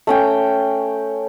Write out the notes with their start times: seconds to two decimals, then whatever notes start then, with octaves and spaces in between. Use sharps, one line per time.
0.07 A3 C#4 G5